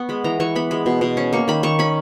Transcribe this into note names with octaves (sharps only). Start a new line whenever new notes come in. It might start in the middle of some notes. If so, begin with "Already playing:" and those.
Already playing: B3 C#6
G#3 B5
E3 A#5
E3 C#6
B3 B5
G#3 B5
B2
B2
C#4
A#3 C#6
D#3 B5
D#3 C#6
C#4 B5